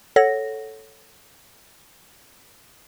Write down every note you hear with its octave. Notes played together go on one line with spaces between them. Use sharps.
A4 C#5 F#5 A#6